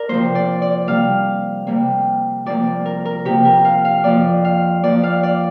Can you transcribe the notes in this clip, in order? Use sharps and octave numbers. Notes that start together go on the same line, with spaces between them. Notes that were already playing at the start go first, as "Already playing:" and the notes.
Already playing: A#4 D5
C3 F3 A#3 C5
D5
D5
C3 G3 A#3 F5
C3 G3 A#3
C3 F3 A#3 D5
A#4
A#4
C3 F3 A#3 G4
A#4
F5
F5
F2 F3 A#3 D5
F5
F2 F3 A#3 D5
F5
D5